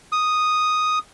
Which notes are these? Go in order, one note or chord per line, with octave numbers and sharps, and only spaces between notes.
D#6